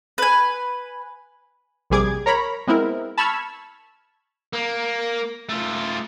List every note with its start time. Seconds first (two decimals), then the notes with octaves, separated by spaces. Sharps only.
0.18 B4 G#5
1.90 A#1 C3 G3 G#4 D6 G#6
2.26 A#4 C#5 A#5 B5
2.67 G#3 B3 C4 E4 A#4
3.17 A5 B5 C#6 E6 F6 G#6
4.53 A#3
5.49 A3 F4